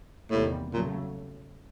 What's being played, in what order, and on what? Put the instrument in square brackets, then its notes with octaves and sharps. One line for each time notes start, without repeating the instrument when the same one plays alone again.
[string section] E2 C3 D#3 G3 A#3 [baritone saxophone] A2
[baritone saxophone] A#2 [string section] C#3 F#3 A3